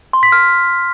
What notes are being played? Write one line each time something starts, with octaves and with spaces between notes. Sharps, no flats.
C6
B6
F6